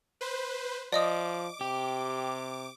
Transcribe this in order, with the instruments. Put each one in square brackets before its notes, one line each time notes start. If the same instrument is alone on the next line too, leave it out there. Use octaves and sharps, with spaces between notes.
[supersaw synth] B4 C5
[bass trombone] F3 [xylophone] D5 D#5 D#6 [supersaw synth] D6
[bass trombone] C3 [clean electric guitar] G4